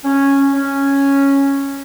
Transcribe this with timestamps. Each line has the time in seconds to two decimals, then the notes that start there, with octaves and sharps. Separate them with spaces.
0.04 C#4
0.54 C#4